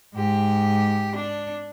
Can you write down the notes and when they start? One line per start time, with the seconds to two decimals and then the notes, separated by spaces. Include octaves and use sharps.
0.14 G#2 G4
1.16 D4